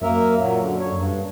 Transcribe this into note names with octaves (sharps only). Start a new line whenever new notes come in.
F#2 A#3 A#4 E5
A#2 F#3
D3
C#5
G2